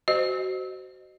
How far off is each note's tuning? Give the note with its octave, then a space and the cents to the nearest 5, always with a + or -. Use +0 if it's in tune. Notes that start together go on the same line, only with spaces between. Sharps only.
F#4 +20 C5 -15 D#5 -20